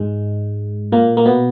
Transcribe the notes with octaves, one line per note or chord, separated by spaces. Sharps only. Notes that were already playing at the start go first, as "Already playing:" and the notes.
Already playing: G#2 G#3
A#2 A#3
A#3
B2 B3